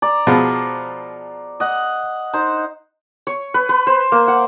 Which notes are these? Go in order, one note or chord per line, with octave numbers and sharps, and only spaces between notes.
D5 A#5
B2 F3 G#3
D#5 F#5
D#4 C5
C#5
B4
B4
C5
A#3
F#5